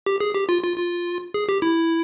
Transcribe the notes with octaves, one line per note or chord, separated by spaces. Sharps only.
G4
G#4
G4
F4
F4
F4
G#4
G4
E4